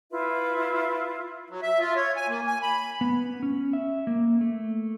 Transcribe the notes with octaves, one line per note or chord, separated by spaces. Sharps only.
E4 F4 B4 E5
F#3
E5
F4
C#5
G#5
A#3
G#5
B5
B3
C#4
E5
A#3
A3